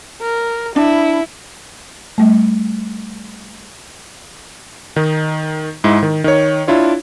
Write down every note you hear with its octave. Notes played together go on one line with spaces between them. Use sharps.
A#4
D4 E4
G3 A3
D#3 D#4
G#2 G#3 E4
D#3
D#3 C#5
D4 E4 F4 C#5